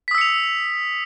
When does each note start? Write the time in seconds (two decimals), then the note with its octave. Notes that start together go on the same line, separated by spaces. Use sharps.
0.08 B6
0.11 D#6
0.15 E6
0.18 C#7
0.21 F7